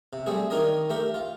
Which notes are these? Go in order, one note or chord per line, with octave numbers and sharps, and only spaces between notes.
C3
G3 A3 C4 G#4
D#3 D4 D#4 A#4 C#5 D#5
A3 G4 A#4
F4